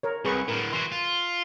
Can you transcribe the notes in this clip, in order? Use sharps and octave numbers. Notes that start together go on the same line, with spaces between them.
A#4 C#5
C2 G#4 B4 C#6
A2 D3 A#4
E3 F#4 C6
F4